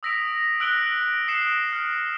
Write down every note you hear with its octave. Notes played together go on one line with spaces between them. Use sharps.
D#6 E6 A#6 B6 D7 F7
E6 F#6 D7 F#7 G7
D#6 C7 C#7 E7
F6 C#7